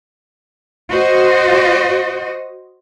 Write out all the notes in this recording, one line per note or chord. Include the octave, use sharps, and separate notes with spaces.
F#4 C5 D#5